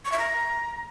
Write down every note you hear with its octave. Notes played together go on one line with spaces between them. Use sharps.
C#6
E5
A#5